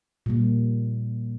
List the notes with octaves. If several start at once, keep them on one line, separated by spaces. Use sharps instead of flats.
A#2 G3 A#3